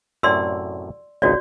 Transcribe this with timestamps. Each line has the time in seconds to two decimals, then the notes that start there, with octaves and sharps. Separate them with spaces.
0.23 F#2 A2 C3 D5 C6 E6
1.22 G#1 C#2 D#4 F#4 C#5 D5